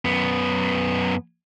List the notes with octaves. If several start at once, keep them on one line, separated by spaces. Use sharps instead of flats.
F#2 B3